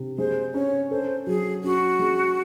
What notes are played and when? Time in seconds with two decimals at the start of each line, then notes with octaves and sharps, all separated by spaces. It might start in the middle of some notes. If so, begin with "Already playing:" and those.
Already playing: C3
0.18 G#3 C5
0.54 C#4 C#5
0.90 A4 C5
1.27 F#3 G#4
1.64 C#4 F#4
1.99 G#3